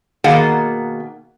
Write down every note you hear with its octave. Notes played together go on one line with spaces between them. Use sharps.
B2 D#3 A#3 G#4 F#5